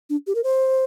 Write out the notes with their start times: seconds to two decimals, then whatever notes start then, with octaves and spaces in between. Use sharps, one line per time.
0.10 D4
0.27 G4
0.35 A#4
0.44 C5